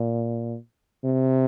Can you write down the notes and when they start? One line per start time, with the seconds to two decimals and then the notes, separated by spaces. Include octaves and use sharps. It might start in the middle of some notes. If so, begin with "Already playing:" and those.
Already playing: A#2
1.04 C3